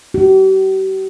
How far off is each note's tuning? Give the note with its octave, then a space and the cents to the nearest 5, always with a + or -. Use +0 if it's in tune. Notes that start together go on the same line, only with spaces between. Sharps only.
G4 -45